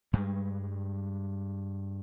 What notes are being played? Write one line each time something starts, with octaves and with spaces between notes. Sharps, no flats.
G2 G3 G#3